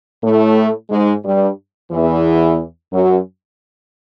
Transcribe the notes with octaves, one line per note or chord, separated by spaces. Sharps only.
A2 A3
G#2 G#3
G2 G3
E2 E3
F#2 F#3